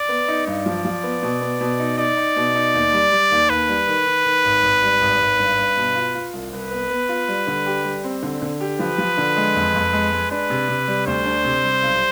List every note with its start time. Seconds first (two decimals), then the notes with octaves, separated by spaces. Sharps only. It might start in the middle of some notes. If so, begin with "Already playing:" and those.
Already playing: D5
0.09 B3
0.28 D#4
0.47 G2 D5
0.66 F3
0.85 F3
1.04 B3
1.23 B2
1.41 B3
1.61 B2
1.79 D#4
1.98 D#4 D5
2.17 D#4
2.36 B2
2.55 D#4
2.74 D#2
2.93 G3
3.12 G3
3.31 D#2
3.50 D#2 B4
3.69 G3
3.87 D#3
4.06 D#3
4.25 D#3
4.44 G#1
4.63 G#1
4.82 G3
5.01 G#1
5.20 G#1
5.39 G2
5.58 G2
5.77 B2
5.95 F4
6.15 F4
6.33 C2
6.52 C2 B4
6.71 B3
6.90 B3
7.09 F4
7.28 G3
7.47 D3
7.66 G4
7.85 G3
8.04 C4
8.22 D3
8.41 D3
8.60 G4
8.79 F3 B4
8.98 F3
9.17 D3
9.37 G#3
9.55 F2
9.74 F2
9.93 G#3
10.12 G#3
10.31 D4 B4
10.50 C3
10.68 C3
10.88 G3
11.06 D2 C5
11.25 D4
11.44 C3
11.63 G3
11.82 B1